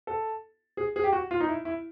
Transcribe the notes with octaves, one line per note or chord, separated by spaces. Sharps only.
A4
G#4
G#4
G4
F#4
F4
D#4
E4
E4